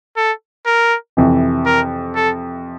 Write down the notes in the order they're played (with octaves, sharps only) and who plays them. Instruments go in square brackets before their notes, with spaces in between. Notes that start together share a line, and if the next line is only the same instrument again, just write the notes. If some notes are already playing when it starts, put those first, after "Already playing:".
[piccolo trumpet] A4
A#4
[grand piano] F2 C3 E3
[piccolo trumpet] A#4
A4